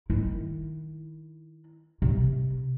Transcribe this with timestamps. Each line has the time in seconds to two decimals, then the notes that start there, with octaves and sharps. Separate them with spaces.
0.10 D#3 E4
2.02 C3